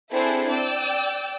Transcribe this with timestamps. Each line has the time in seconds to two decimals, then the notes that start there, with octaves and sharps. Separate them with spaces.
0.12 C4 D4 E4 G#4 A4 C5
0.51 D5 G5 E6